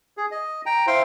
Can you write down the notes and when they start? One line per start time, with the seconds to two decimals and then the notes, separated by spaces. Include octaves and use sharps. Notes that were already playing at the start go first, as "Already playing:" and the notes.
0.17 G#4
0.31 D#5
0.66 G5 A#5
0.87 E4 C5 F5 G5 C6